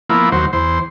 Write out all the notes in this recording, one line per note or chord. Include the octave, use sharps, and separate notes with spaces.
F3 A#3 B3 E4
D#2 F#3 C5
E2 C5